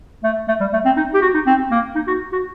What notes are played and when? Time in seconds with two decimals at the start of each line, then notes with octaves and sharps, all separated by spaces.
0.24 A3
0.48 A3
0.60 G3
0.74 A3
0.85 C4
0.97 D#4
1.14 G4
1.22 F#4
1.35 D#4
1.46 C4
1.71 A#3
1.95 D#4
2.08 F#4
2.33 F#4